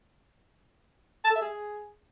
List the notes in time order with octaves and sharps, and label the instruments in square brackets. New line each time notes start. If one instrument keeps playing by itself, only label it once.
[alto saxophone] A5
A4
E5
G#4